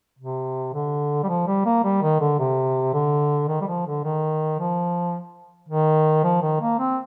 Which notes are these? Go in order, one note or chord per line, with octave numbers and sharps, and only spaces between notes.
C3
D3
G3
F3
G3
A#3
G3
D#3
D3
C3
D3
D#3
G3
F3
D3
D#3
F3
D#3
F3
D#3
A#3
C4